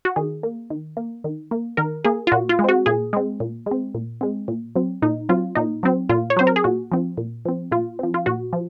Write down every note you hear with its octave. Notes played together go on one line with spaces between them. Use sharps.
F#4
D#3 G#4
A#3
D#3
A#3
D#3
A#3
D#3 A#4
A#3 G#4
F4
A#2 F#4
F4
G#3
C4 F#4
A#2 G#4
G#3 C4
A#2
G#3
C4
A#2
G#3 C4
A#2
F#3 C4
A#2 D#4
F#3 C4 F4
A#2 D#4
F#3 C4
A#2 F4
C#5
F#3 C4 C5
A#4
G#4
A#2 F#4
F3 C4
A#2
F3 C4
A#2 F4
F3 C4
F4
A#2 F#4
F3